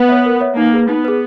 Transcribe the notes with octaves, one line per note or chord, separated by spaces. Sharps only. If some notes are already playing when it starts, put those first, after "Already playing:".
Already playing: B3
C#5 E5
A#4
C#5 E5
A#3 D#4
G#4 B4
B3 D#4
G#4 B4